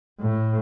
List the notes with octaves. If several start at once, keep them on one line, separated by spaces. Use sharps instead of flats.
A2